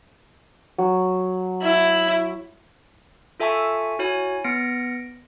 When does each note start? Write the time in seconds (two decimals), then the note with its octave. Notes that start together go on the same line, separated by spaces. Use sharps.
0.78 F#3
1.62 E4
3.40 F4 A4 E5 G#5 A5 C#6
3.99 E4 F#4 C#5 G#5
4.44 B3 F6 A#6 C#7 D7